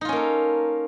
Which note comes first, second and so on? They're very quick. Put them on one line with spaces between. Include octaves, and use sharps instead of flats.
D#4 F4 C#4 A#3 A4